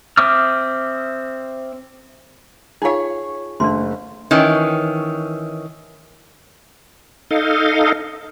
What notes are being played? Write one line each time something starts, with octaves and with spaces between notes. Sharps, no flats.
C4 E5 D6 D#6 F6
D#4 F4 G#4 C#5 F5
F#1 A3 D4 C6
D#3 E3 C#4
D#4 A4 D#5 F5